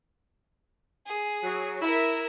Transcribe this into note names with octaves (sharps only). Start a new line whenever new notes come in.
G#4
F#3
E4 A#4 E7